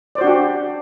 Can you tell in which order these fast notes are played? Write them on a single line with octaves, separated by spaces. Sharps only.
D5 C5 F#4 D4 G4